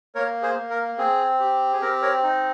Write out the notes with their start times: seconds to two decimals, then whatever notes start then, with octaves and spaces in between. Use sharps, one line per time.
0.15 A#3 A#4 C#5
0.42 G#4 C5
0.57 A#3
0.70 A#4
0.98 C4 G#4
1.40 G4
1.73 G#4
1.82 C4 A#4
2.02 A#4 C#5
2.23 D#4